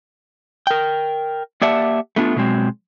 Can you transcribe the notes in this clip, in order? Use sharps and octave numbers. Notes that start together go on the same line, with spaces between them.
A#4 G5
A#3 G4 D5 E5 F#5 A5
A3 B3 D4 F4
B2 D3 F#3 G#3 C4